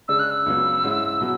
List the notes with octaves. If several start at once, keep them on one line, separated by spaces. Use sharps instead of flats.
C#3 G#3 D4 E6
F#6
E6
C#2 C#3 F#3 B3
G#2 G#3 C#4 E4
B2 F#3 B3